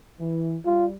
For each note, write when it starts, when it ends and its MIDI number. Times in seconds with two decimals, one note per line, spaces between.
0.19 0.56 52
0.66 0.94 55
0.66 0.86 65